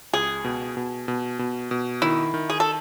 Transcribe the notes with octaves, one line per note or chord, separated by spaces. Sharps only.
C#2 G#4
B2
B2
B2
B2
B2
D#3 E4
D#3
G#4
A4